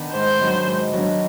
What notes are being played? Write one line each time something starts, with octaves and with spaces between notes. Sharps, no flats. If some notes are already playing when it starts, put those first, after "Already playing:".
Already playing: D#3 B3 D4
G#2 C5
D#3 F#3 B3 D4
G#2
D#3 F#3 B3 D4